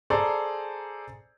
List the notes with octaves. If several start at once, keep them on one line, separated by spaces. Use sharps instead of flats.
G#4 A4 C5 D5 A#5